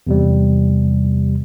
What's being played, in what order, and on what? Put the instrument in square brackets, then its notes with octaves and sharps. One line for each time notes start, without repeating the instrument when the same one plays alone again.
[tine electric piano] E2 C3 G3